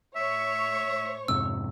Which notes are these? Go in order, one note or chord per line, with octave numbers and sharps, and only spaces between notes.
A2 C#5 E5 C#6
F2 G#2 C3 E6